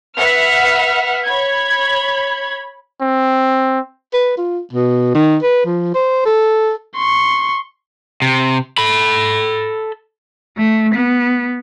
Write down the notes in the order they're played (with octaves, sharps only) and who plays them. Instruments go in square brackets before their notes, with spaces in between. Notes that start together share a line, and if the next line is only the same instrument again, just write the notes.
[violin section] B4 E5 F#5 F6
C#5 B5 G#6
[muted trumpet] C4
[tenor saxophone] B4
F4
B2
D#3
B4
F3
C5
A4
[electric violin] C6 C#6
[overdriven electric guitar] C3
A4 B5
[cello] A3
B3